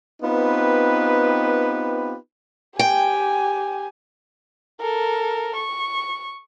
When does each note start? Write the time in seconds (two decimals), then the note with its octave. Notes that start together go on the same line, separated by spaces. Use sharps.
0.22 B3 C4 D#4 F4 G4 B4
2.79 G4 G5 G#5
4.80 A4 A#4
5.56 C#6